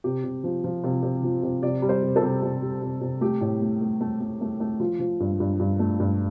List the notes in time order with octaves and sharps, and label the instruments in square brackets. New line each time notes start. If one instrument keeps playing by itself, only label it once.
[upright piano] C3 G4
C3
F3
F3
C3 F4
C3
F3
C3
C3 D5
G3
C5
C3
A4
C3
C3
G3
C3
C3
A3 G4
A2
A3
A3
A3
A3
A3
A3
F3 F4
F3
G2
G2
G2
A3
G2